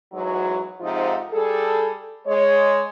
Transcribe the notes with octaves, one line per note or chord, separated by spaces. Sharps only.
E2 G#2 F#3
G#2 C3 F3 D#4 F4
G3 G#4 A4
G#3 C#5